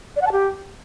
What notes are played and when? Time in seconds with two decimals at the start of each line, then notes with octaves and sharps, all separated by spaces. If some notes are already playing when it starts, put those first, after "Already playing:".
0.16 D5
0.21 F#5
0.27 A5
0.32 G4